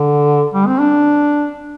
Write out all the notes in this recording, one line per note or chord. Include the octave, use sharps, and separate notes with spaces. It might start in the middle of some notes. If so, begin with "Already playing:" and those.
Already playing: D3
G3
C4
D4